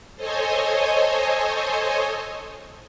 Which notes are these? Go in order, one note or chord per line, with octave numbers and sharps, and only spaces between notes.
A4 C5 C#5 D#5 G#5